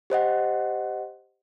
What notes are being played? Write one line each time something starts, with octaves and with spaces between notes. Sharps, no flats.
G4 C5 D#5 F#5